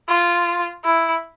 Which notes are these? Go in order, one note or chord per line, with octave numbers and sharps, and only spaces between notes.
F4
E4